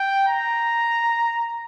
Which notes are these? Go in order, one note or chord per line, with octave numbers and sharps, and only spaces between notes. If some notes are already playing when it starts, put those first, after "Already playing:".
Already playing: G5
A#5